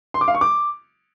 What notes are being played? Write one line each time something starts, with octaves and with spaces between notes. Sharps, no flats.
C6
D6
F5
C#6
D6